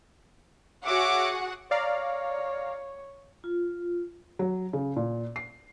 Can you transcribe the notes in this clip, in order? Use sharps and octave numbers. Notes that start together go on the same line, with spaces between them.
F#4 G#4 C#5 E5 F#5 D6
C#5 D5 F5 A#5
F4
F#3
C#3
A#2
C7